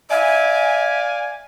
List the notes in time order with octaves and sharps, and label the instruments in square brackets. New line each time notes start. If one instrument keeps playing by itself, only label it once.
[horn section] D5 F5 G#5 [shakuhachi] E5